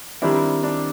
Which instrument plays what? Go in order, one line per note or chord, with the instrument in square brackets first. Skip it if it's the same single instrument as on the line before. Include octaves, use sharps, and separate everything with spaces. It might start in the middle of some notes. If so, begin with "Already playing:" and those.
[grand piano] D#3 G3 C4 E4 [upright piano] D4
[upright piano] D4